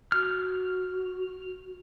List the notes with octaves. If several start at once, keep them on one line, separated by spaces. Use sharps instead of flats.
F#4 F6